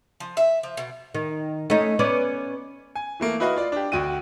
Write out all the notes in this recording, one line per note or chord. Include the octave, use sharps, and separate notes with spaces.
F3
E5
F3
B2
D#3
A3 C#4 D#4
B3 C#4 D5
G#5
E3 A3 A#3
E4 F#4 B4 D#5 F5
F4 D5
D4 G4
D2 F#4 G5 D#7